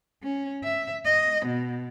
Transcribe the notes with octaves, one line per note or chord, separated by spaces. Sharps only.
C#4
E5
D#5
B2